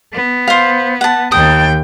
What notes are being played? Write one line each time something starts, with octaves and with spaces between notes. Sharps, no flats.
B3
C5 F5
F#5 A5
D#2 G5 D#6